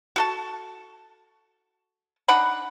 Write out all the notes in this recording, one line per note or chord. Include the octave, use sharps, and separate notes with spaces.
F#4 A4 A5
D4 D#4 F#5 B5